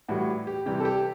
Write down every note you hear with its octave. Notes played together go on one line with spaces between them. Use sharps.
A2 E3 G3 F#4
G4
C3 E3 G3 G4
A4
G4